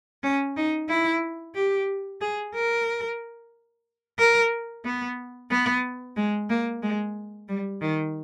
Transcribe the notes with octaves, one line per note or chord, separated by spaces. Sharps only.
C#4
D#4
E4
G4
G#4
A#4
A#4
B3
B3
G#3
A#3
G#3
G3
D#3